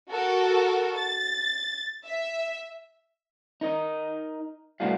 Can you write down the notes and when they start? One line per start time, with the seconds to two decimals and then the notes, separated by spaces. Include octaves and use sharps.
0.10 F#4 A4 A#4
0.96 A6
2.06 E5
3.61 D#4 A#4 D#5
4.80 C2 A2 A3 D4 F#4 F5